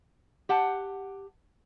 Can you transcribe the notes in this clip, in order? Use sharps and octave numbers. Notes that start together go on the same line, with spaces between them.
G4 F#5 A5